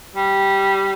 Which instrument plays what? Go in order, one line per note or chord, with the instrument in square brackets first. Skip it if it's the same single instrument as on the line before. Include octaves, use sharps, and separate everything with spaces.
[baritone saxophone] G3